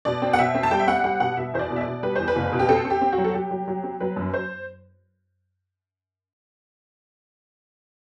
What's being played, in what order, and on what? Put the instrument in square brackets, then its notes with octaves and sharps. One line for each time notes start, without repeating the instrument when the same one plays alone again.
[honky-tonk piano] B2 D5
C4
F#5
B2 E5
C4
A5
G3 G5
E5
C4 F#5
G3 F#5
B2 F#5
B2 E5
E2 C5
D5
B2
E5
D5
B2
G3 B4
E2 C5
B4
F#1
B2
G4
C4 A4
C4
G4
C4
F#4
F#3
A4
F#3 G4
F#3
F#3
C4
F#3 B4
F#2
C5